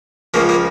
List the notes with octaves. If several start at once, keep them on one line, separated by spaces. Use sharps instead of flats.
C#2 C#3 F3 A#3
A#3